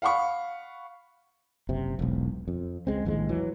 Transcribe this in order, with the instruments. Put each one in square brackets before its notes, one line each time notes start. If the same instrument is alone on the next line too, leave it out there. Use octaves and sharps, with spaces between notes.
[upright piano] F5 F#5 B5 C#6
[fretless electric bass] F#1 C3
E1 B1
F2
C#2 G#3 C4
A#1 D#2 A2 G#3
E3 F#3